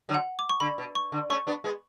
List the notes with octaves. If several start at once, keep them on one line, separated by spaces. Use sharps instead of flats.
D3 F#3
F#5
D6
C#6
D3 B5
B2
C#6
D3
A3 C#4 C#6
B3 D4
G#3 B3